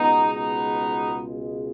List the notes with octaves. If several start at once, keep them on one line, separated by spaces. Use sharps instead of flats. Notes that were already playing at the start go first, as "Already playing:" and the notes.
Already playing: C#2 B2 G#3 B3 D#4
B3 D#4